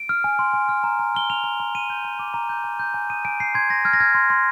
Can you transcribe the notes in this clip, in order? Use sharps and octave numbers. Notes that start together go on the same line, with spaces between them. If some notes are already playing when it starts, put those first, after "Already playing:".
Already playing: D7
F6
G#5
C6
G#5
F6
A#5
A#5
F6 G7
F6 F7
A#5
A#5
A#5 D#7
G6
A#5
D6
A#5
G6
G#5
G6
G#5
D#6 D#7
G#5 D7
G6 C7
C6 G#6
C6 A#6
F6 G#6
A#6
F6 G#6
C6
C6